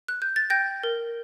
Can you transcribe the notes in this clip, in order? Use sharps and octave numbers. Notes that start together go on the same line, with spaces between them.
F#6
G6
A6
G5 G6 A#6
A#4